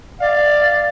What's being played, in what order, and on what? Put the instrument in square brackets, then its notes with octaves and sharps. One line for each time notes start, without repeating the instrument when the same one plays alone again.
[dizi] D5 [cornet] F5